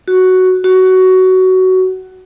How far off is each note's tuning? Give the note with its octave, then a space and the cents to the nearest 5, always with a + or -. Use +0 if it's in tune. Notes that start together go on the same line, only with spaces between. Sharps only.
F#4 +5
F#4 +15